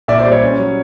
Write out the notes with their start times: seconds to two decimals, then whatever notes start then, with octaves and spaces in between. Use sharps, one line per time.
0.08 A#2 D5 E5
0.19 C5 D5
0.26 G3
0.32 C#5
0.42 C#4
0.59 F#3